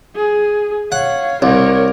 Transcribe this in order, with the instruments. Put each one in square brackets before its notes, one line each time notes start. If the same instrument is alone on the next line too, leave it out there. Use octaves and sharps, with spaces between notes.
[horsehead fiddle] G#4
[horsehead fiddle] C#5 F5 [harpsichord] F#5
[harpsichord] C2 [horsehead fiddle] A#4 C#5